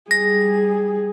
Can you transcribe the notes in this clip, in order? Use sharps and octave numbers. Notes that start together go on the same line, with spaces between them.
G3 G#4 A#6